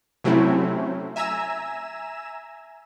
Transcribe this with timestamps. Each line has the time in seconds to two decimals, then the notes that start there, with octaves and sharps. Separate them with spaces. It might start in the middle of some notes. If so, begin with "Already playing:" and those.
0.24 C3 F#3 A3 C4 C#4 E4
1.16 E5 G#5 A#5 E6 E7